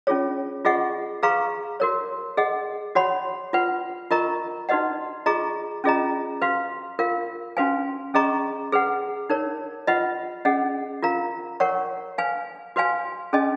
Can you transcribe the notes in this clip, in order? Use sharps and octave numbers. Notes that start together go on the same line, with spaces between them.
C#4 F4 G#4 C#5
F4 G#4 D#5 F#5 C#6
G#4 B4 F5 A#5 C#6
F#4 A#4 C#5
G#4 D#5 F#5
F#4 C#5 F#5 B5
F4 B4 F#5
F4 A#4 D#5 A#5 C#6
D#4 F#4 B4 D#5 F#5
F4 G#4 D#5 A#5 C#6
C#4 F4 G#4 D#5 A#5
F#4 B4 F5
F4 A#4 F5
C#4 F#4 B4 F5 G#5
C#4 G#4 D#5 A#5 C#6
G#4 B4 F#5
D#4 A#4 C#5
F4 B4 D#5 F#5
C#4 G#4 D#5 F#5
F4 A#4 F5 A#5
A#4 C#5 F#5 C#6
B4 F5 G#5
F#4 B4 F5 G#5
C#4 G#4 D#5 G#5